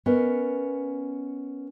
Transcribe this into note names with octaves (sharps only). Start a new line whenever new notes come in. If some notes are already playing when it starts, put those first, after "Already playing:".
B3 C#4 A#4 D#5